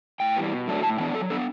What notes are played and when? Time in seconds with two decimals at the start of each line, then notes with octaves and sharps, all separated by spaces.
0.20 A2 G5
0.36 E3 G3 B3
0.52 B2
0.68 F#3 A3 D4
0.82 A2 A5
0.98 E3 B3 D4 G5
1.14 F#3 A4
1.30 B3 D4 A4